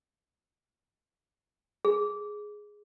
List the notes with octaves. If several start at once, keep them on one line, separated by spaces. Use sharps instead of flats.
G#4